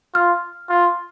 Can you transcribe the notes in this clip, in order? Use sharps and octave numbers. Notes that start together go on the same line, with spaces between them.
F4 F6
F4